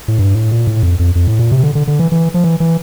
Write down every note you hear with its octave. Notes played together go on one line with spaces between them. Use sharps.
A2
G2
A2
A#2
A2
F2
F2
F2
A2
A#2
C3
D3
D3
D3
E3
E3
F3
E3
E3